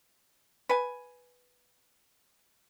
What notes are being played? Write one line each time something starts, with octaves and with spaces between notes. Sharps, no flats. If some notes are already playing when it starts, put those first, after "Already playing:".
B4 G#5